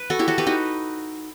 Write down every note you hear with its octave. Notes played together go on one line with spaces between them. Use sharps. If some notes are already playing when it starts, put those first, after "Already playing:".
Already playing: B4
F#4 A4
E4 G4
F#4 A4
G4 B4
D#4 F#4